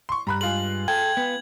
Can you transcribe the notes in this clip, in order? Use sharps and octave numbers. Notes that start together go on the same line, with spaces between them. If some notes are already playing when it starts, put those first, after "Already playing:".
C6 C#6
G2 A#5 B5 F#6
G#3 F4 G#4 F#7
A4 G5 G#6
B3